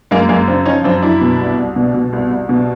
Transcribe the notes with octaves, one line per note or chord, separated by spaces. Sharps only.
F#2 G#3 A#3
F#2 G#3 A#3
C#3 C4 D4
F3 C#4 D#4
F#2 C4 D4
F#2 D4 E4
B2
C2
C2
B2
B2
C2
C2
B2